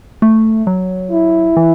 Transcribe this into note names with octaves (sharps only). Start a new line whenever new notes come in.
A3
F#3
E4
E3